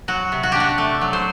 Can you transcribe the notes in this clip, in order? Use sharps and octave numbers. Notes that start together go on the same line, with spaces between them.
F#3 F#4
C3
F#4
D4 G4
F#4
A3
F#3
C5